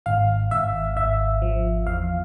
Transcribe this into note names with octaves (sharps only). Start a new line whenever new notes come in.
G#1 F5
G#1 E5
G#1 E5
F3
E2 F5